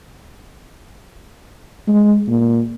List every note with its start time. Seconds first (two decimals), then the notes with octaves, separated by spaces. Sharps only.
1.88 G#3
2.28 A#2